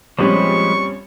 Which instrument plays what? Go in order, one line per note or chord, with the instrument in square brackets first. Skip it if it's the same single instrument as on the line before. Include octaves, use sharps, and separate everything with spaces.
[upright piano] A#1 C4 C#4 [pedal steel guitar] F3 G#3 B4 [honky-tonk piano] G3 [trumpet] C#6